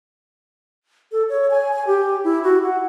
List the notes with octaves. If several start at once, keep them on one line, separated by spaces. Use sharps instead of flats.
A4
C#5
G#5
G#5
G4
E4
F#4
F#5